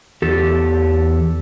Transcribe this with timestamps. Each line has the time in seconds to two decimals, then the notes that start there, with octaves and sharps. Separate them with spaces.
0.22 E2 G4 A4